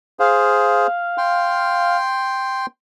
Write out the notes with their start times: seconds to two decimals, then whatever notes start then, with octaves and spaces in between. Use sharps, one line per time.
0.19 G#4 C5 F5
1.18 G5 C6